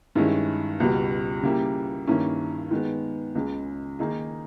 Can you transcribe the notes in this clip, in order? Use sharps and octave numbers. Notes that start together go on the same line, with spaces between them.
G2 D#3 G#3 C#4 E4
C#2 B2 G3
C#3 G3 A#3 E4 G4
G2 D#3 A#3 C#4 E4
D#3 G#3 B3
C#2 C#3 G#3
D#3 A#3 D#4 G#4